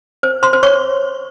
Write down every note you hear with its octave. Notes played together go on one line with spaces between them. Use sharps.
C5
C5 C6
C5
C#5 C#6